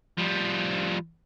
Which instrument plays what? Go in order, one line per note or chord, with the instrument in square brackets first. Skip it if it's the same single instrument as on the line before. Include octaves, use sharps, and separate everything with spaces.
[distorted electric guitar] F3 G3